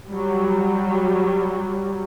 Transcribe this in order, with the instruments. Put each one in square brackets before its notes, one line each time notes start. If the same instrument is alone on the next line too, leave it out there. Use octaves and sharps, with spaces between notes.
[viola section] F#3 G3